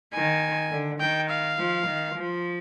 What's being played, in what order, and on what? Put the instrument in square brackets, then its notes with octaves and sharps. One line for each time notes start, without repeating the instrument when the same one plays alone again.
[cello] D#3 [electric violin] G#5
[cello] D3
[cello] D#3 [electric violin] G5
[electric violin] F5
[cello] F3
D#3
F3